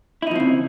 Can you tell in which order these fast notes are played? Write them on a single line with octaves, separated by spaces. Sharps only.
E4 D#4 F3 C4 C#3